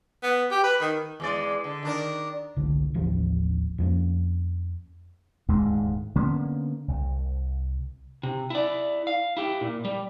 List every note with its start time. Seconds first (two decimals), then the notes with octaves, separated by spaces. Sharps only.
0.23 B3
0.51 G4
0.64 B4
0.81 D#3
1.20 E2 G#3 D5
1.64 D3
1.83 D#3 D4 A#4
2.56 G1 C2 D3
2.94 D#1 A1 E3 F3
3.78 F2 F3 A#3 C#4
5.48 D#1 D2 G#2 G#3
6.15 D3 A#3 B3 C#4
6.88 C2
8.23 C3
8.50 E4 D5
9.07 F5
9.37 E4 G4
9.61 A#2
9.85 G3